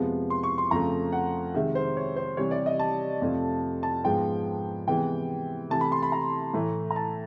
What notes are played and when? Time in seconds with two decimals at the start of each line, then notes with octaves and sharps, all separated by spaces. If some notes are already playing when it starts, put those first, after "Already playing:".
Already playing: F2 C3 F3 G#3 B3
0.30 C6
0.43 C#6
0.58 C6
0.71 F2 C#3 F3 A3 A#5
1.12 F#5
1.54 C3 D#3 G#3 E5
1.75 C5
1.97 C#5
2.16 C5
2.37 C3 E3 G3 C#5
2.51 D5
2.66 D#5
2.79 A5
3.22 F2 C3 F3 A3
3.83 A5
4.04 G#2 F3 G#3 B3 G5
4.88 C3 E3 G#3 B3 G5
5.70 C3 E3 A3 A5
5.81 B5
5.92 C6
6.03 B5
6.12 A#5
6.54 A2 E3 A3
6.91 A#5
6.96 A5